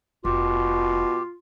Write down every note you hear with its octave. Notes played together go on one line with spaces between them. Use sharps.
F1 B2 F4 G4